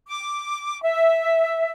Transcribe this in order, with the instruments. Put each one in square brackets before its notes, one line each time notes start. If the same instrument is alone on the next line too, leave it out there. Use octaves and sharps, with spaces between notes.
[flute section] D6
E5